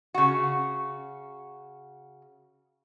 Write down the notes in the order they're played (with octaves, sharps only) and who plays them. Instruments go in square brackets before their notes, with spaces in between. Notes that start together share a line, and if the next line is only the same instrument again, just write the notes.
[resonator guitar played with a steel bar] C#3 F#4